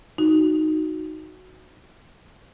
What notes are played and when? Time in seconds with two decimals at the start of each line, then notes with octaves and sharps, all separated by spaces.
0.18 D#4 F#4